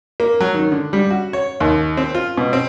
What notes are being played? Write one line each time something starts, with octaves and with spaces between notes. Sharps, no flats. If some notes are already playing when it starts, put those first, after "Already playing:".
A#3
F#3
D#3
D3
G3
F#4
C#5
D#2
C4
F4
B2
C4